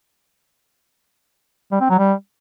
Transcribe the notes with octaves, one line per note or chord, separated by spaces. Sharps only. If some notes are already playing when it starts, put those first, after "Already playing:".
G3
C4
F#3
G3